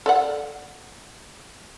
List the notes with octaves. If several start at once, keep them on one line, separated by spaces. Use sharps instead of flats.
A4 D5 F#5